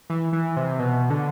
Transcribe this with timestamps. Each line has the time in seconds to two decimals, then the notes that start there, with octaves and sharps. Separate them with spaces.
0.10 E3
0.33 E3
0.57 C3
0.79 B2
1.10 D3